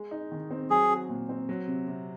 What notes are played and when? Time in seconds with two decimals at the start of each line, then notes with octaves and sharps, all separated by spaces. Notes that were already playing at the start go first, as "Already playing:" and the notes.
Already playing: G#3
0.11 D#4
0.32 D#3
0.51 C4
0.70 F#3 G#4
0.90 F#4
1.09 A#2
1.29 C4
1.49 F#3
1.68 C3
1.87 C3